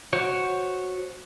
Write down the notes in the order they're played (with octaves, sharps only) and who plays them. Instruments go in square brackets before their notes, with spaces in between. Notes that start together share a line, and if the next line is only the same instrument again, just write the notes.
[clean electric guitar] F#4 C5 C#5